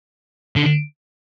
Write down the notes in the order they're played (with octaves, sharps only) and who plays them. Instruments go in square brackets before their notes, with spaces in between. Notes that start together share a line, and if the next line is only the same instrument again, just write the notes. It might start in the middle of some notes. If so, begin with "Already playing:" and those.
[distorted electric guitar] D3